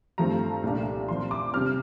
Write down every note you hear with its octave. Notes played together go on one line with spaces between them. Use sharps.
G2 F3 A3 C4 A#5
C2 A#2 A3 D4
A#2 F3 C4 C6
D6
C3 G3 C4 F6